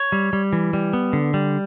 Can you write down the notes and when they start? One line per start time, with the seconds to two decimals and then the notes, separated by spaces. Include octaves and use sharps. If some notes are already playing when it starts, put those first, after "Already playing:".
Already playing: C#5
0.12 G3
0.33 G3
0.53 E3
0.73 G3
0.93 B3
1.13 D3
1.34 G3